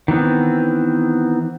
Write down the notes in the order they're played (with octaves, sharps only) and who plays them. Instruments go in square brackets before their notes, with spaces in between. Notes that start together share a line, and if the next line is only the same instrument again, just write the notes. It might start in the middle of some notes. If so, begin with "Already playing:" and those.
[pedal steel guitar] D#3 E3 B3 C4